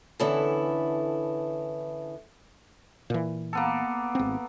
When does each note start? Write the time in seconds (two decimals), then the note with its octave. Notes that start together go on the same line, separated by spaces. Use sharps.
0.19 D3 E3 B3 C#4 E4 A4
3.10 A#2 E3
3.53 A#3 B3 A4
4.15 G#1 C4